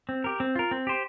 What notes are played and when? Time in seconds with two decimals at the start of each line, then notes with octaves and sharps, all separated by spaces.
0.09 C4
0.24 G4 A#4
0.40 C4
0.56 F4 A#4
0.71 C4
0.87 G4 C5